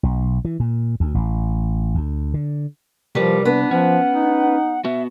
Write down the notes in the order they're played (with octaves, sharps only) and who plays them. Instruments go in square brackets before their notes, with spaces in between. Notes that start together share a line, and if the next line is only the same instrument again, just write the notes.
[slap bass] B1
E3
A#2
D2
A1
D2
D3
[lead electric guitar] C2 B4 [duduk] F3 [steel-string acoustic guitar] G3 [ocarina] A#4
[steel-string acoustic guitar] B3 [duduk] D4
[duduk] F3 [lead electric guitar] C#4 [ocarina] F#5
[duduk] D#4
[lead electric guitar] B3 F#4 [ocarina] E5